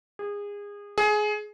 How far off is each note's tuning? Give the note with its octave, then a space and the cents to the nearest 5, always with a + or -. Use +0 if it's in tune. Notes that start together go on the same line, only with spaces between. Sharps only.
G#4 -25
G#4 +20